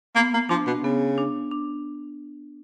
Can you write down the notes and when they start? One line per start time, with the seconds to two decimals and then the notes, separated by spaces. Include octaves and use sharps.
0.15 A#3 B3
0.34 A#3
0.49 F3 D4
0.67 B2
0.83 C#3 B3
1.18 D4
1.51 D4